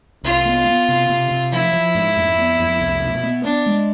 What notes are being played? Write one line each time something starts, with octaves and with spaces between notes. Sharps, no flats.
C2 F4
B3
B3
C3
C3
C3
F3 E4
F3
G#2
F2
B3
F2
C2
B2
B3
B3 D4
G#3